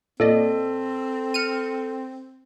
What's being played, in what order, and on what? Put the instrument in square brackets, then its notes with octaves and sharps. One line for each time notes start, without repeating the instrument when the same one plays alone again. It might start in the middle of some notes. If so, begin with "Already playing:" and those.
[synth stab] A#2 D5 D#5 [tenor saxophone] C4 [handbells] A4
[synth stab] F6 C#7 D#7